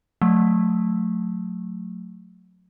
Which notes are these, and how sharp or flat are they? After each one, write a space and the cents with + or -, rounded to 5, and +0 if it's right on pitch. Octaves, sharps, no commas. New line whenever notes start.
F#3 -25 A3 +0